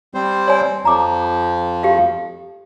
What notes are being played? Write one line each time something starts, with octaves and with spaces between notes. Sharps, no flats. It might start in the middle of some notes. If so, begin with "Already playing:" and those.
G3 C4 C5
C#5 D5 G#5
F2 F3 A#5 D6
G4 F5